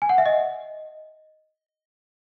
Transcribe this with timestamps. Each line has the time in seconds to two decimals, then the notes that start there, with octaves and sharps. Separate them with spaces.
0.02 G#5
0.09 F#5
0.18 E5
0.26 D#5